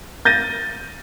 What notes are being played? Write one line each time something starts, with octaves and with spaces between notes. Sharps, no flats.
G6 A6 A#6 D#7